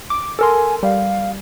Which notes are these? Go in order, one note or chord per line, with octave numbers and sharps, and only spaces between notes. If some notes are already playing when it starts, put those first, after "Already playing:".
D6
A4 A#4 G#5 C6
G3 F5